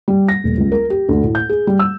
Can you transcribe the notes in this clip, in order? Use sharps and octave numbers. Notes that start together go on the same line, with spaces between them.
G3
A#6
D#1
C#2
A#4
G4
D2
A2
G6
G#4
G3
E6